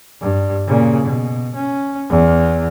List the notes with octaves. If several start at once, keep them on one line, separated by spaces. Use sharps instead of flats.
G2
A#2 C#3
B2
C#4
E2